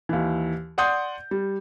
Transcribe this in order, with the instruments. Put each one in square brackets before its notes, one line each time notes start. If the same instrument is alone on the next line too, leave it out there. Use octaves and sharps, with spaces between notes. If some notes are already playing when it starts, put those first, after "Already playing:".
[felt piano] D#2 E3
D5 F#5 C6 D#6 G6
G3